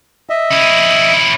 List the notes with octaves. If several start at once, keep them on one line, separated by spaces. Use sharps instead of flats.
D#5 E5
C#4 E4